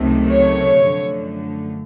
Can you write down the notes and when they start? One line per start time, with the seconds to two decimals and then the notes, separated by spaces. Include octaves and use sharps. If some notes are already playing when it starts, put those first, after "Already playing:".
Already playing: C#2 C3 D#3 F#3 A3
0.29 C#5
0.76 F#2 D3 F3 A3